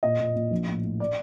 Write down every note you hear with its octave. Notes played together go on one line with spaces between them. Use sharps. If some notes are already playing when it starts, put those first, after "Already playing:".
A#2 D#5
A#2
A#2
A#1
A2
A2
D5